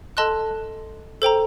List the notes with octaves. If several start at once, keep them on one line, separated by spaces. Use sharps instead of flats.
A4 D#5 A5 C6 F#6
A4 C5 G5 A#5